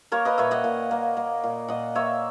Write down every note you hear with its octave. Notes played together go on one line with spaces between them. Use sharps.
A#3 A#4 C#5
B4 D#5
A#2 C#5 E5
D#5 F#5
A#2
A#3
A#3
A#2
A#2 D#5 F#5
A#3 C#5 E5